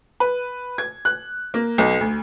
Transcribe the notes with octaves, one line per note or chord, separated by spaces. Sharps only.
B4
G#6
F#6
A#3
B1
D2